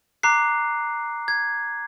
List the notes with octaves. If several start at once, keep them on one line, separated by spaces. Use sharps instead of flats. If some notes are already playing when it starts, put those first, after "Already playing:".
A#5 D6 F#6 C7
G#6